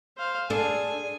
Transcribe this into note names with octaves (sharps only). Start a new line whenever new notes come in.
C5 F5
D4 G#4 A4 G#5